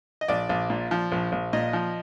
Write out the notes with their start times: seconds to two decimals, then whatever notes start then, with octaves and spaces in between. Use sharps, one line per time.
0.21 D#5
0.28 A#1 D5
0.49 A#1
0.70 A#2
0.91 F3
1.12 A#1
1.32 A#1
1.53 A#2 D#5
1.73 F3